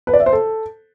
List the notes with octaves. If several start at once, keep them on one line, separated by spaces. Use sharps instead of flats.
B4
D5
E5
C5
A4